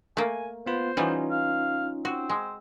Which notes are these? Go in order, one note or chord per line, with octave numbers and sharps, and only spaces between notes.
A3 A#3 G#5
B3 F4 B4 C5
E3 G3 B3 C#4 D#4 F4
F5
C4 F#4
G#3